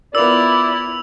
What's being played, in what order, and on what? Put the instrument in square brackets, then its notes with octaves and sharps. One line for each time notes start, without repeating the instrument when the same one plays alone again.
[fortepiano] B3 F4 A#4 [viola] E4 [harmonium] D5 [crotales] E6 F7